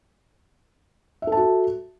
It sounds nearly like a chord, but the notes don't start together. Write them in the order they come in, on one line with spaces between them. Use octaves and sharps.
E5 A4 A5 F#4